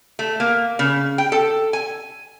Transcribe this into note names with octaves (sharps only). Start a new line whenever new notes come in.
A3
A#3
C#3
G5
A4
G#5